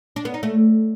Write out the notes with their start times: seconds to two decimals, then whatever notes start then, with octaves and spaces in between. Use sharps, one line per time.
0.16 D4
0.25 B3
0.34 D#4
0.43 A3